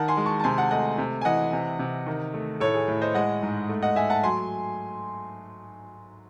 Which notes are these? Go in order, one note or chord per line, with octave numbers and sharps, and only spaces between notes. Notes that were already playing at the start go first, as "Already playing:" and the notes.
Already playing: D#3 F#5 A5
G#5 C6
G#3
A5 C#6
A5
C3 G#5 C6
F#5 A5
A3 D#5 F#5
C3
G#5
E3 D#5 F#5
C3
C3
D#3
A3
A2 A4 C#5
G#4
A2
C5 D#5
G#3 D#5 F#5
G#2
A3
D#5 F#5
A3 E5 G#5
F#5 A5
F#3 G#5 C6